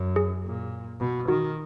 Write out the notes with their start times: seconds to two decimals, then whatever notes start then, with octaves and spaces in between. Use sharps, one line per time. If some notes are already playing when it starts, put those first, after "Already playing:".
Already playing: F#2
0.16 G#4
0.45 A#2
1.00 B2
1.28 D#3 F#4